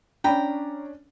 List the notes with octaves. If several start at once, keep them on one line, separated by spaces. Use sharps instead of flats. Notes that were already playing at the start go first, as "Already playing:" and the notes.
C#4 D4 G5 A#5 B5